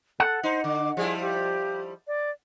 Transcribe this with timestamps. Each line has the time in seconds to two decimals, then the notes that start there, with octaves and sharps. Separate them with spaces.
0.20 A4 F#5
0.43 D#4 C5
0.64 D3 D6
0.97 F3 G3 E4 G#4
1.21 G4
2.07 D5